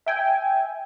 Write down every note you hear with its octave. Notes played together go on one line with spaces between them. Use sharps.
E5 G5 G#5